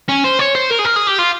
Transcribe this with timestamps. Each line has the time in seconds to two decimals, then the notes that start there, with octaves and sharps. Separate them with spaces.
0.09 C#4
0.24 C5
0.39 C#5
0.55 C5
0.70 A#4
0.79 G#4
0.85 A#4
0.96 G#4
1.07 G4
1.19 F4